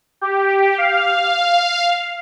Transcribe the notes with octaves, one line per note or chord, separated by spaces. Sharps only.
G4
F5